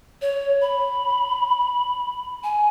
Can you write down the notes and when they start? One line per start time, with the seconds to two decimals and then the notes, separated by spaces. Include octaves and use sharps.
0.22 C#5
0.62 B5
2.43 G#5